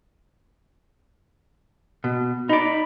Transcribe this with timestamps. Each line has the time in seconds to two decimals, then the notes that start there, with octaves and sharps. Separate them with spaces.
2.04 B2
2.49 D#4 D5 B5